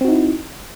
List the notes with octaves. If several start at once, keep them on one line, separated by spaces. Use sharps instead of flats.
C4 D#4 E4 F#4